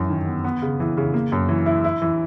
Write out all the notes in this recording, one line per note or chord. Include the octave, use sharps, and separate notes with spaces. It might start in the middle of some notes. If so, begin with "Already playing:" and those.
Already playing: F#2 E3 F#3
D#3
B3
B3
C#3
E3
C#3
A#3
F#2
E3
E4
E4
E3